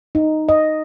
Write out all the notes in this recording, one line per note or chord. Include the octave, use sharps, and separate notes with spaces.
D#4
D#5